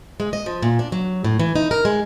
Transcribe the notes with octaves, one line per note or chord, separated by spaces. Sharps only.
G#3
D#5
F3
A#2
D4
F#3
A2
E3
D#4
A#4
G#3